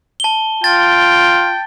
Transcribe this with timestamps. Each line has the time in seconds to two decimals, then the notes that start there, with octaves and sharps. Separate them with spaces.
0.20 A5 G7
0.64 F4 G5 A6